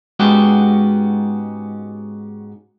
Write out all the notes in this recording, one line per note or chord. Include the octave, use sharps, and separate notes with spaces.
G#2 G#3 B3 C#4 F#4 G4